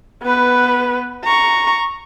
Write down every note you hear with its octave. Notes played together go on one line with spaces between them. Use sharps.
B3 B4
A#5 C#6